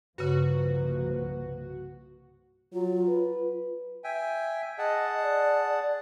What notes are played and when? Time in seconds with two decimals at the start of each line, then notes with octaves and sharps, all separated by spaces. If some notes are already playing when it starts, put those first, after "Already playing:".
0.18 C2 G2 C#3 F3 A#3 F#4 B4
2.73 F#3 F4
3.08 B4
4.04 E5 G5 G#5
4.78 G#4 D#5 F#5 A5
5.23 D5